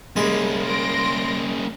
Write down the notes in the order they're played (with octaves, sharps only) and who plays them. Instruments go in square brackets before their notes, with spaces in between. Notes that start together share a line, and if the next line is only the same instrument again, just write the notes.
[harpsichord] C2 G#3 B5 [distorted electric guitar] A#3 C#4
[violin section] C6 A#6 D7